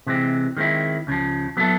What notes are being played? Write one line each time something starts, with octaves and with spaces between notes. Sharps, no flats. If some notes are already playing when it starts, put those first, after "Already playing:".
C3 E3 G#3 C4
D#3 G#3 C4 E4
C#2 C#3 F3
F#3 B3 E4 A4